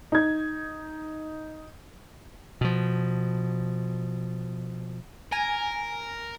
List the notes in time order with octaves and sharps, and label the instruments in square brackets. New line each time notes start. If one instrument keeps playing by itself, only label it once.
[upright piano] D#4 G#6
[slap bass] B2 F3
[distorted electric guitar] A#4 [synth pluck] G#5